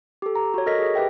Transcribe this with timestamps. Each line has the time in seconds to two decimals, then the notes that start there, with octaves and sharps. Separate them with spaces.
0.22 G4 A4
0.35 A#5
0.54 F#4 C#5
0.66 A4 A#4 D#5 A#6 B6
0.79 G#4
0.95 G4 B4 E5 G5